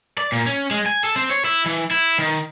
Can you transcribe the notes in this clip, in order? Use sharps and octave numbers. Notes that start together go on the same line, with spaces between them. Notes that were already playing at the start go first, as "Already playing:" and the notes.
D5
A#2
C#4
G#3
G#5
A4
C4
C#5
E4
E3
E4
D#3